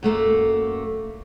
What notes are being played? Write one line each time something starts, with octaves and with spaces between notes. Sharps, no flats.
F#2 A3 A#3